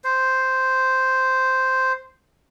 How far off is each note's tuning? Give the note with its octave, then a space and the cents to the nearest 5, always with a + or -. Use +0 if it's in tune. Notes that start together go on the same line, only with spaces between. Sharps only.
C5 -5